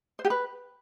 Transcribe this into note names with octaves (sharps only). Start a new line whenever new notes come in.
C5
G4
B4